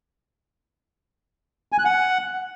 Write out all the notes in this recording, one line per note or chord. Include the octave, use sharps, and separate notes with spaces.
G#5
F#6
F#5